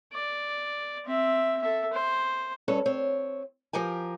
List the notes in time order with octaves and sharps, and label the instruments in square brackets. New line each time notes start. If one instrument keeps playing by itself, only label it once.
[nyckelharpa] D5
C4 E5
A4 E5
C5
[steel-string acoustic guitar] G2 C#4 A4
C4 C#5
F3 G4 A#4 G#5